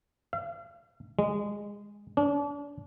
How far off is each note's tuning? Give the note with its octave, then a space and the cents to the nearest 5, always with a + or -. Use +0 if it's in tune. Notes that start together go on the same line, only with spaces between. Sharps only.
F5 -40
G#3 -15
D4 -40